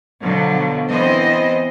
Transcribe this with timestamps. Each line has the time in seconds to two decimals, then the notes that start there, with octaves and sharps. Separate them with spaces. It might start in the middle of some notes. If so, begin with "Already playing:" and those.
0.22 B2 D3 F3 F#3
0.89 E3 B3 C4 E4 C5 D#5